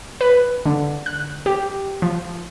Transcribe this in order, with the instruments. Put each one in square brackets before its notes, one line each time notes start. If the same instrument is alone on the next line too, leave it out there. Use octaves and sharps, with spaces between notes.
[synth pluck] B4
D3
F#6
G4
F3